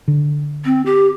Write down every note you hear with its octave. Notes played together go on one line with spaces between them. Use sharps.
D3
C4
G4